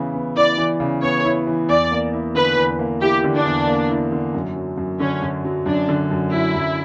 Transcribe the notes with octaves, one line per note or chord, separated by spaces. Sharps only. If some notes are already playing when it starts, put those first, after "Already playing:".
Already playing: C#3 E3 B3 E4
B3
E4 D5
E3
C#3
B3 C#5
E4
E3
E2 D5
A#3
E4
D3 B4
E2
A#3
E4 G4
D3
D4
E2
A#3
E4
D3
F#2
F#3
F#2
D3 C#4
F#2
F#3
F#2 D4
D3
F#2
F#3 E4
F#2